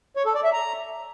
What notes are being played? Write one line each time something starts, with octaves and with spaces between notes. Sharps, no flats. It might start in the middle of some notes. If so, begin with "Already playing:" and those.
C#5
A4
D5
E5
A#5